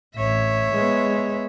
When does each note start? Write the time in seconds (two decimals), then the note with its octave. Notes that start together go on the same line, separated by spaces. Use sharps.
0.16 A1 C#5 E5
0.72 G#3 B3